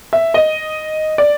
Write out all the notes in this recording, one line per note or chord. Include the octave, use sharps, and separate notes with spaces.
E5
D#5
D5